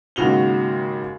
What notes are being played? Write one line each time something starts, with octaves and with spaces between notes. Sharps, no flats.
D#2 G#2 C#3 F#4 F7 G7